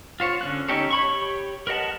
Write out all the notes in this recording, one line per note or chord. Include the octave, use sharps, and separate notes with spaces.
F4 C5 C#5
D3 C#4 F#6
C#4 D#4 G4 A4 C#5
C#5 B5 C#6
G4 C#5
A#4 B4 D#5 F#5 A5